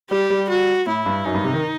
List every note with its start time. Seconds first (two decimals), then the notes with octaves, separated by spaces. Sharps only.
0.11 G3 G4
0.30 G3
0.49 F#4
0.86 A2 E4
1.06 G2
1.24 F#2 D#4
1.34 G2
1.44 C3
1.54 D#3